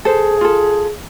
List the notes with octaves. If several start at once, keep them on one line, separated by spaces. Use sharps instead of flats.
G#4 A4 C5
F4 A4